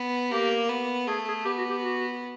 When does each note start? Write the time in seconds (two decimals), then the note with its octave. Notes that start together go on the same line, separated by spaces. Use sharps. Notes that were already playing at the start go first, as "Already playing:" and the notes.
Already playing: B3
0.32 A#3 G4
0.69 B3
1.08 A3 G#4
1.28 G#4
1.45 B3 G4
1.58 F#4
1.70 G4
1.83 F#4